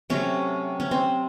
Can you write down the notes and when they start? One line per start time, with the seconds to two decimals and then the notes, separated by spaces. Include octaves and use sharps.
0.10 C3 F#3 A3 C#4
0.80 C#4
0.91 C4